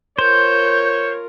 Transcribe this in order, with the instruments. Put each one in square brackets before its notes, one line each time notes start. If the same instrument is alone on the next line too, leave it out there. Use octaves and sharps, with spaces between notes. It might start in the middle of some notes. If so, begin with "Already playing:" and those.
[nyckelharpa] F4 A#4 [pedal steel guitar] C5 [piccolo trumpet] C#5 [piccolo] G6